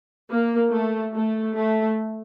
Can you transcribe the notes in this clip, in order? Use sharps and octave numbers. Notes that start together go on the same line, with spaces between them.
A#3
A3
A3
A3